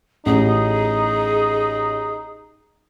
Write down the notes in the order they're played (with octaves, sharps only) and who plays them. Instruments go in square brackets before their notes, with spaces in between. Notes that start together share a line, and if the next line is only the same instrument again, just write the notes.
[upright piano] A1 [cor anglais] D#4 [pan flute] G#4